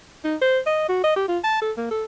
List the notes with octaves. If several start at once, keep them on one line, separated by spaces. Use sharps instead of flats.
D#4
C5
D#5
F#4
D#5
G4
F4
A5
A4
A#3
A4